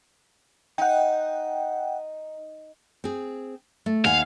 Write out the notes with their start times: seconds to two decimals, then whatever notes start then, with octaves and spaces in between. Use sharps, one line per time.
0.78 D#4 F#5 G5
3.04 C4 G#4
3.86 A3
4.05 D#2 F5 F#5 G#5